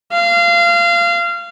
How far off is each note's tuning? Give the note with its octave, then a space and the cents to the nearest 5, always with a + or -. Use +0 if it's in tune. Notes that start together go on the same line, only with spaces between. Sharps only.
F5 -25